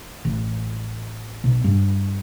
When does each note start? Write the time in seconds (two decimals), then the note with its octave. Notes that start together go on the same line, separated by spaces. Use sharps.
0.25 A1
1.44 B1
1.64 G2